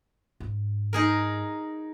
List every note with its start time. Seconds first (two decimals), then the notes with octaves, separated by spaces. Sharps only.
0.40 G#2
0.93 D#4 G#4 A#4